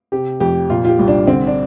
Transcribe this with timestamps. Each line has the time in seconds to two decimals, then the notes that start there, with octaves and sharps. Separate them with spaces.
0.12 C3 G4
0.40 F2 G4
0.70 A#2 F4
0.85 F4
0.88 G4
0.99 C2
1.08 D4
1.27 D3 C4
1.47 D4